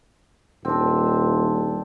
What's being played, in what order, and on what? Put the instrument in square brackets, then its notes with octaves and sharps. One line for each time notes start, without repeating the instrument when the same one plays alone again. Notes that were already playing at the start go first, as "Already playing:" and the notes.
[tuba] D#1 [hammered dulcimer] C4 D4